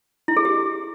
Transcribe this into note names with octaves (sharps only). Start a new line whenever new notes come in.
E4
G#4
G4